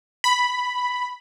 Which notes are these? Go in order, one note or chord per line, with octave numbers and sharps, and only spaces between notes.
B5